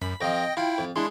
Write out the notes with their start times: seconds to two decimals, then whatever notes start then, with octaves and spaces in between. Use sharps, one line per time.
0.02 F#2 B5
0.21 F2 F3 D#5 G5 A#6
0.57 E4 F4 G5
0.78 F2
0.96 G#3 D4 E4 C6